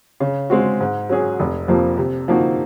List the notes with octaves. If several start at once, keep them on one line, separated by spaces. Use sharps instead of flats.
C#3
G#3 C4 F#4
G#2
F#3 C#4 G#4
F1
F2 C3 F3 A#3
C3
F3 A#3 D#4 F#4